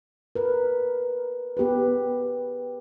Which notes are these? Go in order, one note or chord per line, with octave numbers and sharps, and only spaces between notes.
A#4 B4
B3 G4 G#4 B4